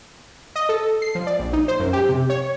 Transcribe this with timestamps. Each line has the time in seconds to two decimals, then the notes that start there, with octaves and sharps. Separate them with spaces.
0.56 D#5
0.69 A4
1.02 C7
1.15 F3
1.27 D5
1.39 A#1
1.53 D#4
1.68 C5
1.80 F#2
1.93 G4
2.09 C3
2.30 C#5